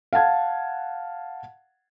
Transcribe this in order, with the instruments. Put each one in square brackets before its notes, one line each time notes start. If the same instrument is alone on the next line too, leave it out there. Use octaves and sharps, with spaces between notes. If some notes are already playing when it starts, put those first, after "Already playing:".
[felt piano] F5 F#5 A5 G#6